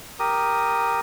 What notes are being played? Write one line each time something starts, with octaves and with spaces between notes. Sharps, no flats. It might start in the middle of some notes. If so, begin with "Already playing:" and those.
G4 A#4 D#6